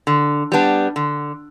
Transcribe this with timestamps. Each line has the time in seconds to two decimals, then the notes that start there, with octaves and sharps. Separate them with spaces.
0.07 D3
0.52 G3 B3 D4
0.96 D3